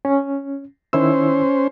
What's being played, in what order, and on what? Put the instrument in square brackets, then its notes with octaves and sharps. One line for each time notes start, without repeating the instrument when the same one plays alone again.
[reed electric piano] C#4
[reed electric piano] D#3 E4 E6 [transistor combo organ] C#4 C5